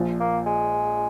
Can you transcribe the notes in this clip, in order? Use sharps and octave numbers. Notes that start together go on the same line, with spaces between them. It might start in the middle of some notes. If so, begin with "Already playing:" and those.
Already playing: A#1 A#2 F3
A#3
G#3